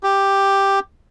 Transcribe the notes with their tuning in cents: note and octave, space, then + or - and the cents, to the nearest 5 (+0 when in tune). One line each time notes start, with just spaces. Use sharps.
G4 +5